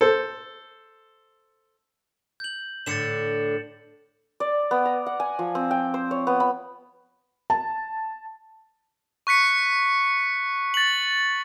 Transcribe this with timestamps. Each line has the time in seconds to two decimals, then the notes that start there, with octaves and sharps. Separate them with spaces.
0.01 A4 C5
2.40 G6 F#7
2.86 A2 D3 A6 C#7 E7
4.40 D5
4.71 B3
4.85 A#5
5.06 F#5
5.20 G#5
5.39 F3
5.55 C4
5.71 G5
5.94 C5
6.11 C#5
6.27 B3
6.40 B5
7.50 A5
9.27 C#6 F#6 B6 C#7
10.74 A6 F#7